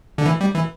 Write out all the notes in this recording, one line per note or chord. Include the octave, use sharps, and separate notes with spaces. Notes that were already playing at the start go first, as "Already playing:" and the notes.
D3
E3
G3
E3